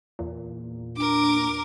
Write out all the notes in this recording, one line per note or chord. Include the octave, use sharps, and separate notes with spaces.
E2 A#2
D4 A#4 D6